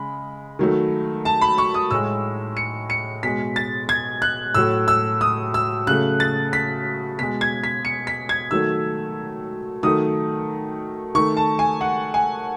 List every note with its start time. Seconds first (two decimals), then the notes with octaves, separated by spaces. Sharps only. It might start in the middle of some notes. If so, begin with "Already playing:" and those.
Already playing: C#3 G#3 B5
0.59 D#3 F#3 A3
1.25 A5
1.41 B5
1.58 C#6
1.74 D#6
1.91 A2 G#3 E6
2.57 C#7
2.90 C#7
3.23 B2 G#3 B6
3.56 A6
3.89 G#6
4.22 F#6
4.54 A2 F#3 A3 E6
4.88 E6
5.21 D#6
5.54 E6
5.87 C#3 F#3 A3 F#6
6.20 A6
6.53 B6
7.19 B2 G#3 B6
7.41 G#6
7.64 B6
7.85 C#7
8.07 B6
8.29 G#6
8.51 D#3 F#3 A3 E6
9.83 D#3 F#3 A3 D#6
11.15 D#3 A3 C#6
11.37 A5
11.59 G#5
11.81 F#5
12.14 G#5